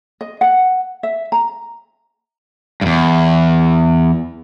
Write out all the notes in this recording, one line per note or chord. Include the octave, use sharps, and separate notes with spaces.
D#5
F#5
E5
A#5
E2 G2